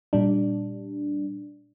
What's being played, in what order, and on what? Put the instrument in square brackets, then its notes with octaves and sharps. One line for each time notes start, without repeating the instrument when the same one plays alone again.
[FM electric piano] A#2 G3 D4